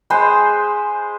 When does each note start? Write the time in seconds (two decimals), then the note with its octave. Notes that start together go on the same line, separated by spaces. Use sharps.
0.10 G#3 G#4 B4 C5